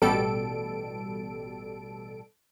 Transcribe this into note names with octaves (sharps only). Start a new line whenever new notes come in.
A1 B2 G3 A4 D7